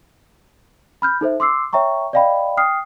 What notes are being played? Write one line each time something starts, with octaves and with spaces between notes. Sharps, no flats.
B5 F6 G6
D#4 A4 C5 E5
C6 D6 E6 C7
C#5 E5 G5 A#5 C#6
D5 D#5 F5 G5 B5
G5 D#6 F6 C7